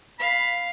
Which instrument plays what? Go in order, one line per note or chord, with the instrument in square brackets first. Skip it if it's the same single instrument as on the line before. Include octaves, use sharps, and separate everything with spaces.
[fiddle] F5 [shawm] B5